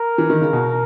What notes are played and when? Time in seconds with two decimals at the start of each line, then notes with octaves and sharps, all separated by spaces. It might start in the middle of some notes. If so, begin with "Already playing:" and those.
Already playing: A#4
0.18 E3
0.30 D#3
0.41 C#3
0.53 B2